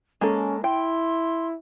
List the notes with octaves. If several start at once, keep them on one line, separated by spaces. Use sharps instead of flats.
G#3 A#3 C#4 A4
E4 G5 C6